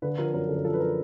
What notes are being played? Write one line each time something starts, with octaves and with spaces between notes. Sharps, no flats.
D3 B4
F3 A#4
F#2 A#4
D3 A4
A#4
F3 A4
B4
F3 A#4